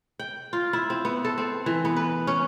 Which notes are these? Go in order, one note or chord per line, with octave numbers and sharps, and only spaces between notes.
G5
F4
E4
C4
B3
A4
C4
E3
B3
B4
C#4